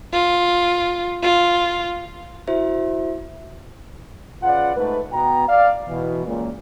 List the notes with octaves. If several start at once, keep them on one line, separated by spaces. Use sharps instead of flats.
F4
F4
E4 F#4 C5 E5
C#3 F4 B4 D5 F#5
G#2 A3 B4
B2 B3 G5 A#5
D5 F5
B2 E3
C#2 A#2